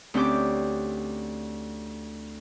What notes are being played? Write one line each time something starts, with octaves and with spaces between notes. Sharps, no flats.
D2 C4 C#4 G4 G5 D6